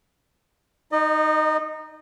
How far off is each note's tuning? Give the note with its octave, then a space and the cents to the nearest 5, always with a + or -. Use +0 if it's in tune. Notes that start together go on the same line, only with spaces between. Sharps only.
D#4 +0 D#5 -30